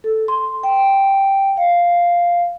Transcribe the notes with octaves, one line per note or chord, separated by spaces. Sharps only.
A4
C6
G5
F5